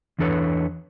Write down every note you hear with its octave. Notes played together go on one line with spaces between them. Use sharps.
E2 E3 D4 A4 B4 C#5